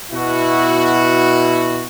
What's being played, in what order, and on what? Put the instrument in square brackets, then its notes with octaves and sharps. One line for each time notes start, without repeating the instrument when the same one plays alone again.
[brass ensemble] B2 E4 F#4